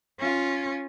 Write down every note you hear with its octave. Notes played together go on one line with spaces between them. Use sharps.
C#4 F4